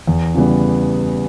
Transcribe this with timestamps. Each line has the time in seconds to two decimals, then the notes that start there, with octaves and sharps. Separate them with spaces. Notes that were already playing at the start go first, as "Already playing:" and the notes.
0.07 E2
0.35 C#3 E3 G3 B3